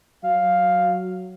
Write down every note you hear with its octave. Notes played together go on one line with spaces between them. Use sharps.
F#3 F5